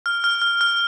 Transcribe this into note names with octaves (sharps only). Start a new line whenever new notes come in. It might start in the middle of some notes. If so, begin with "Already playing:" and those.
F6
F6
F6
F6